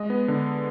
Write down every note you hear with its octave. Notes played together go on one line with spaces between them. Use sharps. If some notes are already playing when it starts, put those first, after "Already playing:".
Already playing: G#3 D#5
B3
D3